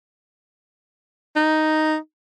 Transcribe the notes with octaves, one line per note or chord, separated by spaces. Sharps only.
D#4